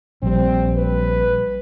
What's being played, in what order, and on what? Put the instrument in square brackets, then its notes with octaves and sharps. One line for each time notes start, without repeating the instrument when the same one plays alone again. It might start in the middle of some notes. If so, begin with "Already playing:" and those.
[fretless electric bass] A#1 G3 [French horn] C4
[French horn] B4